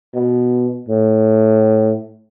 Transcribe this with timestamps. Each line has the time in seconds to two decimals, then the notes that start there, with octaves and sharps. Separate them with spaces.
0.15 B2
0.89 A2